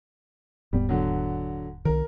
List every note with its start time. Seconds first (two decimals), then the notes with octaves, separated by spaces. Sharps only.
0.73 D#1 G#2 G3 B3
0.89 D3 F#3
1.85 C2 D#3 A#4